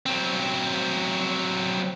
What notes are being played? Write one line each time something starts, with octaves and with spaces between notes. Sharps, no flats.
F#3 C4